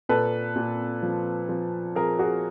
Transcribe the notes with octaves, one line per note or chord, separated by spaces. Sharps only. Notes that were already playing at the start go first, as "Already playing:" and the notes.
A#2 A4 B4
A#2
F3
F3
F3 G#4 A#4
F#4 G#4